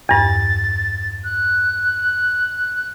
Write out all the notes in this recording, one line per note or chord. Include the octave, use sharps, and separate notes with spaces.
E2 G2 A6
F#6